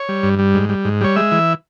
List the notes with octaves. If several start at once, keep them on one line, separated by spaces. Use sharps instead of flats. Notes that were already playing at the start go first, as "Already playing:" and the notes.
Already playing: C#5
G3
G2
G3
G#2
G3
G#2
G3 C#5
G#3 E5
E3